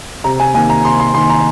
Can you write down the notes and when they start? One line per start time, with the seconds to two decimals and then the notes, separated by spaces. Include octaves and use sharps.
0.24 C3 A#5
0.40 G#5
0.54 D#3 A#3 G#5
0.70 A#5
0.85 C3 C6
1.00 C6
1.14 D#3 A#3 C6
1.29 A#5